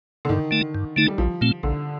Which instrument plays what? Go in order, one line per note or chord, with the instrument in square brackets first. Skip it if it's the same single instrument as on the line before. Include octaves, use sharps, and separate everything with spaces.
[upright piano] D3
[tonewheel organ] G2 [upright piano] D#3
[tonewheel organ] D3 A3 D#4
G2
D3 A3 D#4
[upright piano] G3
[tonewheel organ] A#1 [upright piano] F3
[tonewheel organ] A#2 A3 C4
[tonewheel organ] A#1 [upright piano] D3